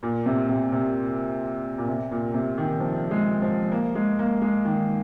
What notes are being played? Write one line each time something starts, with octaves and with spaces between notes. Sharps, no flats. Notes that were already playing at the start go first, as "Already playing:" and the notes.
A#2
C3
C3
C3
A#2
C3
A#2
C3
D#3
F3
G#3
F3
A#3
G#3
A#3
G#3
D#3